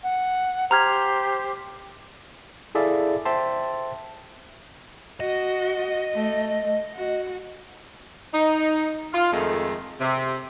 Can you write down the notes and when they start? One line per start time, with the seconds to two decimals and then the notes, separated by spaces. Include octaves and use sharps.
0.03 F#5
0.71 G4 C5 A#5 F6 G#6
2.75 E4 G#4 A4 D5 E5 F5
3.25 C5 E5 G5 A5 C6
5.20 F#4 D#5
6.15 A3
6.94 F#4
8.33 D#4
9.12 F4 F5
9.32 F2 D#3 G#3 A3
10.01 C3